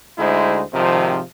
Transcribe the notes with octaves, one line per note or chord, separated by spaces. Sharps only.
D2 G#3 D#4 E4 C5
G#1 C3 D#3 F3